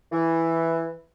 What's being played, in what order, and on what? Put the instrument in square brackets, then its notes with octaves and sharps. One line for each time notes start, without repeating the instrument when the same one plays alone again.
[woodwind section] E3